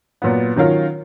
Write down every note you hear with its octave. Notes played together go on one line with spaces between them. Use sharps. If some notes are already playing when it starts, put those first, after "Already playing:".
A#2 F#3 B3
D#3 F#3 C#4 F4 A#4